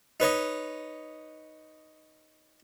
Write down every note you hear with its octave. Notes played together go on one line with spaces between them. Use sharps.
D#4 B4 C#5 D#5